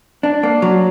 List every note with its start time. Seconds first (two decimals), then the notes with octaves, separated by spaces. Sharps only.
0.23 D4
0.43 A#3
0.62 F#3